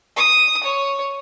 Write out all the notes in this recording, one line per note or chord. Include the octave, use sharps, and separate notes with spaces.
D#6
C#5